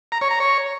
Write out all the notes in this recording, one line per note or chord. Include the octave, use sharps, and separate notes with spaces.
A#5
C#5
A#5
C#5